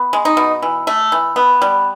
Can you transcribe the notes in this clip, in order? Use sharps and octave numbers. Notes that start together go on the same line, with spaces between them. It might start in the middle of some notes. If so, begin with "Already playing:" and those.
Already playing: B3
G#3
D#4
B2
E3
A3
E3
B3
G3